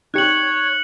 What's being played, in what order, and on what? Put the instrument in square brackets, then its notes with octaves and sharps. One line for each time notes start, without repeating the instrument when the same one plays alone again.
[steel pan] D#4 G4 [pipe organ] C#5 [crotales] F#6 C#7 F#7